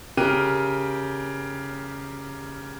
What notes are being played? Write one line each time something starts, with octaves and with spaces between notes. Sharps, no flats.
C#3 G4 A#4 G5 F#6 D#7